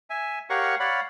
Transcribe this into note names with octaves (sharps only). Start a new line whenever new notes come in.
E5 G#5
G4 A#4 C#5 F5 F#5 C#6
C#5 D5 F5 F#5 B5